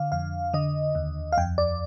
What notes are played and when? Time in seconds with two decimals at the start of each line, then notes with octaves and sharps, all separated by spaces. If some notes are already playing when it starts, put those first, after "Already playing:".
Already playing: D3 F5
0.12 F2 F5
0.54 D3 D#5
0.95 D#2
1.32 F5
1.38 F2 G5
1.58 D5